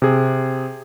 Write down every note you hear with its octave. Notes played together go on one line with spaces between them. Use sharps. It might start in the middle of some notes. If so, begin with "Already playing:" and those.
C3 G#4